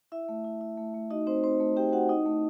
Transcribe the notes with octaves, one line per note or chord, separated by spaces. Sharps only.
E4 E5
A3
E4
E4
A3
A3
D#4 F#4 D#5
C4 D#4 C5
C4 C5
A3
C4 G4 G5
C4 F#4 F#5
D#4 E4 D#5
A3